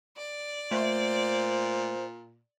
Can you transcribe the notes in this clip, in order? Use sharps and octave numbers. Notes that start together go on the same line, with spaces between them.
D5
A#2 A3 C5